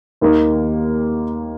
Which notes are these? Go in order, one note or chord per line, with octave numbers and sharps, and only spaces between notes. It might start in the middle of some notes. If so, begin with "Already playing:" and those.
D#2 D#3 A#3